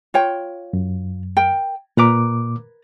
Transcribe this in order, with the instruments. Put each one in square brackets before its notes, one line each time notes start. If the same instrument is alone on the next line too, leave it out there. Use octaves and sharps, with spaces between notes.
[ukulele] F4 C#5 G5
[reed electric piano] F#2
[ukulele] A#4 G5
[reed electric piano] A#2 D6 [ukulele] A#4 B4 A#5